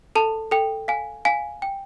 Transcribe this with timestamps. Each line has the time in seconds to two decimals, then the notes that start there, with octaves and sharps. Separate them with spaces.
0.15 A4 A5
0.51 A4 G5
0.88 F5 G#5
1.25 F5 G#5
1.62 G5